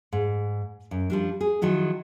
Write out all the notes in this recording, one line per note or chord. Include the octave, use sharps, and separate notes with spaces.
G#2
F#2
F3 G3 D4
G#4
D#3 F3 F#3 E4